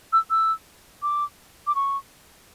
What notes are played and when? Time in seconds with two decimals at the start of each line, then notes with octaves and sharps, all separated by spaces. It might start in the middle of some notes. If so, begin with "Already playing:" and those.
0.13 E6
0.30 E6
1.02 D6
1.67 D6
1.75 C#6